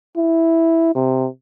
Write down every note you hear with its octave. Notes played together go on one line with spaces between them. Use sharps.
E4
C3